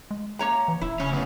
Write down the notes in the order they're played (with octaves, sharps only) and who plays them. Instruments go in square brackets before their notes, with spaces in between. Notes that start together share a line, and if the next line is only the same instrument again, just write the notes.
[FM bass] G#3
[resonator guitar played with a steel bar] A#3 C#5 A#5
[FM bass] E3
[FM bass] D1 [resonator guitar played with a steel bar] E4
[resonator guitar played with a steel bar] C#3 [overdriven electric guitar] C#4
[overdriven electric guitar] D2 B3